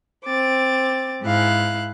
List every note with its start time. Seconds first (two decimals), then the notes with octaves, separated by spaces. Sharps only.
0.25 C4 D6 A6
1.23 G#2 E4 F5 F#6